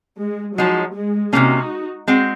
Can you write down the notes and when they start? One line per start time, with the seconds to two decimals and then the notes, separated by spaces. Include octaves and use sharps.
0.20 G#3
0.57 F3 F#3 G#3 D#4 F#4
0.94 G#3
1.33 C3 F#3 A#3 C#4 D#4 F#4
2.07 G#3 C4 F#4